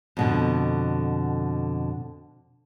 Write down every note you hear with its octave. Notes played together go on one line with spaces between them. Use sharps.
F2 B2 D3